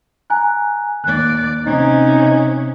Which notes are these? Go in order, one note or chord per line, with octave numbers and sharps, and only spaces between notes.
G#5 A#5 F#6
D#2 D5 F#6
C3 C#4 D#4